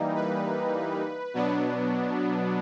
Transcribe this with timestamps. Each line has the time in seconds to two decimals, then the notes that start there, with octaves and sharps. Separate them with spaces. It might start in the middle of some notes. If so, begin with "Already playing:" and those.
Already playing: E3 G3 A#3 D#4
0.15 B4
1.34 B2 F#3 B3 D4